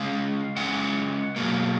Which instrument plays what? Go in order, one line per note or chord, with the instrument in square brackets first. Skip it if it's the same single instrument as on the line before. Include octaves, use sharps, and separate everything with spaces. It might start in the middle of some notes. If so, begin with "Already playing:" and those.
Already playing: [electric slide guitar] C#3 G#3 F5
C#3 G#3 F#5
B2 F#3 A#3